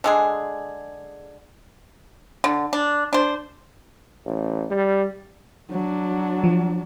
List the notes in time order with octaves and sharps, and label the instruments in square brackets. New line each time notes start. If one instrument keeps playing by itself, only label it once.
[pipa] D3 G#3 G#4
D3
D4
D4 C5
[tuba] A1
G3
[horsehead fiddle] F#3 D4
[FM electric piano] F3